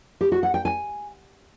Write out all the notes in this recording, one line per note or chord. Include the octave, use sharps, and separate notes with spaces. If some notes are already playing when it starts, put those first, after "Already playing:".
G4
F#4
F#5
G5
G#5